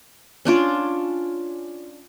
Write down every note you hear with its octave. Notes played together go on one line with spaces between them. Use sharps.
C#4 D4 F4 D5